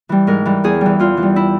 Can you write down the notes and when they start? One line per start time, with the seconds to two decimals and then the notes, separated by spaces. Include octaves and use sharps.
0.09 E3 G3
0.27 G#2 A#4
0.45 E3 G3
0.64 E2 G#4
0.81 E3 G3
0.99 E2 F4
1.17 E3
1.23 G3
1.36 E4